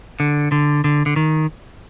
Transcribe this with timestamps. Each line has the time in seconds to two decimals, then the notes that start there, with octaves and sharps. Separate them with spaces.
0.20 D3
0.52 D3
0.84 D3
1.06 D3
1.16 D#3